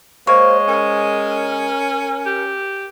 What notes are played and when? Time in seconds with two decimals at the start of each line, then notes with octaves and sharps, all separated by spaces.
0.27 G#3 A#3 C5 C#5
0.68 C#4 A#4
2.26 G4